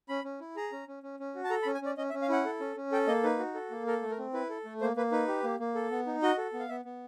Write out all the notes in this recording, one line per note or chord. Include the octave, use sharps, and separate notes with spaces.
C#4 B5
C#4
E4
G#4 A#5
C#4
C#4
C#4
C#4
F#4
A5
A4 A#5
B5
C#4
G#5
C#4 D5
C#4 D#5
E5
C#4
F5
E4 F#5
A4
C#4
C#4
A4 G5
A#3 D#5
D#4 B4
F#4
A4
A#3
A4 A#4
A3
A#4
C4
E4 B4
A4
A3
A#3 C5
A#3 B4
D#4 B4
G4
A#3
A#3
A4
B3
D#4
F#4 D#5
A4
B3
F5
B3 E5
B3